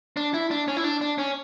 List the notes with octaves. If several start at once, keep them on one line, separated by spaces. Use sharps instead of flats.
D4
E4
D4
C#4
E4
D4
D4
C#4